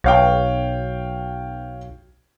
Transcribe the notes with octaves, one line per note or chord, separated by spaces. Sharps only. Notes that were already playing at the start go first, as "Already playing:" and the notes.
B1 C#5 F5 G5